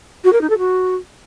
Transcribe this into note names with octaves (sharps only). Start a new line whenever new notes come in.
F#4
A#4
D#4
A4
F#4